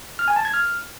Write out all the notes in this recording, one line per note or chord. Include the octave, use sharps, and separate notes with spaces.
F6
G#5
A5
G#6
F6